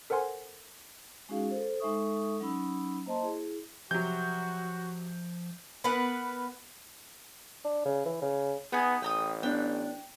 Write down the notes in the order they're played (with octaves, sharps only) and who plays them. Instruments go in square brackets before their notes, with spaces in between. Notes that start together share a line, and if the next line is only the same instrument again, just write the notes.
[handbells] A4 A#4 C5 F#5 G#5 C6
[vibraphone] G#3 C#4 D#4 F#4 G#4 F5
A4 C5
G#3 D#4 A4 E5 C#6 D#6
F#3 C#4 D#4 B5 E6
A#3 C5 D#5 A5 C6
E4 G#4
[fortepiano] C3 F#3 [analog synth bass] F3 [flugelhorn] F#4 [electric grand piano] G6
[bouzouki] B3 A#4 B4 F#5
[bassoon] D4
C#3
E3
C#3
[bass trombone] B3 [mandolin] D#4 G#5 D#6 [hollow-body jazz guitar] G#4
[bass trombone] A1 [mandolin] G5 A#5 D#6
[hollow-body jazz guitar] B3 D4 [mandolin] G5